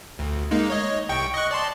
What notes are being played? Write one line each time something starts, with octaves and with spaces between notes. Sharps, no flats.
D2
G#3 A#3 D#4
C#5 D#5
C2 G5 C#6
D#5 C#6 F#6
D5 A5 C6